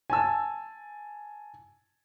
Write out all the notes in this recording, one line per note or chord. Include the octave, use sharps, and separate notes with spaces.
G#5 A5 E6